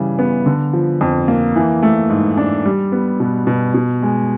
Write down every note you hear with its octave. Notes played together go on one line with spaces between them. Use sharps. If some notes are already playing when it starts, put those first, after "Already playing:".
Already playing: C#3 E3 G3
B3
D3
F3
F2
A#3
E3
A3
G#2
D4
G3
B3
B2
B2
B2
G#3